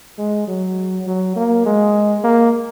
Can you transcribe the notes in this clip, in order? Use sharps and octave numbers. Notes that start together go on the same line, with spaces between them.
G#3
F#3
F#3
A#3
G#3
A#3